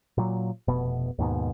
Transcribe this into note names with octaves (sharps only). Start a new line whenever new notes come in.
A#2 F#3
F1 B2 B3
D#2 G#2 B2